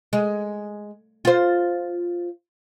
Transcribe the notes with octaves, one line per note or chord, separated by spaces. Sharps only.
G#3
F4 C5